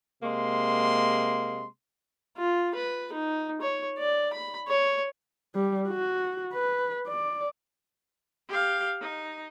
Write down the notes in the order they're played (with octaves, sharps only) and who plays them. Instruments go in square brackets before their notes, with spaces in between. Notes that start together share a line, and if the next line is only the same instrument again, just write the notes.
[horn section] C3 G#3 A#3 C6
[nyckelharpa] F4
B4
D#4
C#5
D5
B5
C#5
[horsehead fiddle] G3
F#4
B4
D5
[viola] G4 F5
D#4